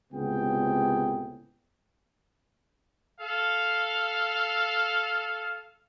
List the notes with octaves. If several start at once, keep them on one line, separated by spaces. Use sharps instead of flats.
C#2 A2 C3 B3 G#4 G5
A4 F5